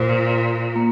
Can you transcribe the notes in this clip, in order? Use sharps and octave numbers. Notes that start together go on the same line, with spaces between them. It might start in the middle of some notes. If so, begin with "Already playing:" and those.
Already playing: A#2 C5
F4
A#3